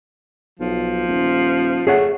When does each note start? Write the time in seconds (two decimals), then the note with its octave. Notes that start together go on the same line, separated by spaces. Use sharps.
0.59 B1 F3
1.08 D#1
1.87 A3 G#4 C#5 F#5